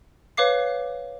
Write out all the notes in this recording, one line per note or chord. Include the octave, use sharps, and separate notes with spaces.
B4 C#5 F5 D6 C7